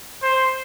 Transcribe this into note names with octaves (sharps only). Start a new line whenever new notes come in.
C5